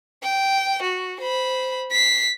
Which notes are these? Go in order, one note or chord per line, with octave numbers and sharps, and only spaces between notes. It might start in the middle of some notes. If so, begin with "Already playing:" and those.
G5
F#4
C5 B5
B6 C7